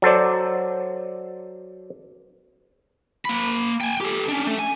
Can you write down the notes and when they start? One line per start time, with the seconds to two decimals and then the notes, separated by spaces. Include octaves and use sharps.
0.02 F#3 A4 C5 D5
3.25 A#3 B5
3.81 G5 G#5
4.01 G4 A4
4.29 C#4 D4
4.47 A3
4.59 G#5